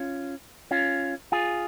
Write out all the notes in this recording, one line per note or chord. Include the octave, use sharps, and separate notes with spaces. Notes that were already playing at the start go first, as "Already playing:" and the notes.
Already playing: C#4 F4
C#4 F4
F4 G#4